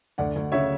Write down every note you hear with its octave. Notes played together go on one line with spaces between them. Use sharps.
D2 D5 F#5
D2
C#3 C#5 E5